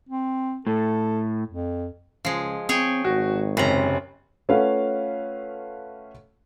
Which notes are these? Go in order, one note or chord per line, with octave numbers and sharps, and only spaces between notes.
C4
A2 A4
F2
C#2 F3 G#3
C4 G#4 C#5 G5
G#1 F#4
F#1 C3 C#4 A#5 F#7
A3 C#4 F4 B4 F5 F#5